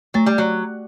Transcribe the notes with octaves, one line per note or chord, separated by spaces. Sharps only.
F#3 A3
G3
F#3